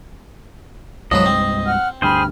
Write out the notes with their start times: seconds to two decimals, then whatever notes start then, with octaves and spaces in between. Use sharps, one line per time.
1.11 C2 G2 F3 F#3 G#3 B4 D#5
1.26 C4
1.65 F#5 F6
2.02 D2 G2 G#4 C5 G5 B5 F6